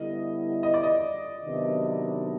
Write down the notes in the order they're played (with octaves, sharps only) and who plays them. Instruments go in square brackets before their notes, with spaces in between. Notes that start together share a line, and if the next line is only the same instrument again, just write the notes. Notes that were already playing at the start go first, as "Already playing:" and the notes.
Already playing: [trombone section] D3 G3 B3 E4 [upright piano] D#5
[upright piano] D#5
D5
D#5
[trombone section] C3 D#3 F#3 B3 D4